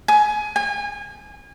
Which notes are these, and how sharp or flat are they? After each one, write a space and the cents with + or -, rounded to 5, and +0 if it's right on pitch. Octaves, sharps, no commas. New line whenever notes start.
G#5 +20
G#5 -30